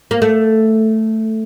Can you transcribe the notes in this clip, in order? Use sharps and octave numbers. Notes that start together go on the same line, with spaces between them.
A#3
A3